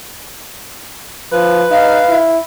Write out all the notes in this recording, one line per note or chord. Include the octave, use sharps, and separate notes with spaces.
F3 B4
D#4 F5
E4